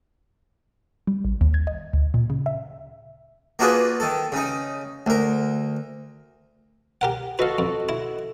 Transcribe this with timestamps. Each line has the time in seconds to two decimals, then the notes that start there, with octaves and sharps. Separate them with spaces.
1.07 G3
1.25 A1
1.41 D#2
1.54 G#6
1.67 D#5
1.93 D2
2.14 A#2
2.30 C#3
2.46 E5
3.59 A#3 D4 F4 F#4 G#4 B4
4.00 D#3 A4
4.32 C#3 D#4
5.07 D2 A#4
7.01 G4 A#4 F#5
7.39 F#4 A4 B4 D#5 F5
7.58 F2
7.89 E4